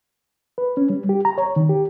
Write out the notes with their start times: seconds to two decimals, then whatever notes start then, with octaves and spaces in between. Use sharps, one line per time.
0.58 B4
0.77 C#4
0.90 G3
1.09 G4
1.25 A#5
1.38 C#5
1.56 D#3
1.69 G4